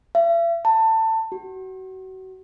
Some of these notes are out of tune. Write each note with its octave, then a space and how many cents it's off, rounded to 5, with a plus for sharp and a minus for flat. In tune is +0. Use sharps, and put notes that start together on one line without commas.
E5 +45
A5 +20
F#4 +30